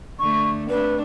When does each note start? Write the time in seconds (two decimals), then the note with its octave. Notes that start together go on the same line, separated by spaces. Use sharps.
0.19 D3 A3 C#6
0.69 A3 C4 D4 B4